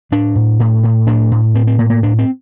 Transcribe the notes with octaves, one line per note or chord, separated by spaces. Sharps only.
A2 D4
A2
A2
A2
A2 D4
A2
A2 C4
C4
A2 A#3
A#3
A2 D4
C4